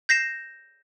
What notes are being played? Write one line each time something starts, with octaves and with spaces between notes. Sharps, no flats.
G6 A#6 C7 E7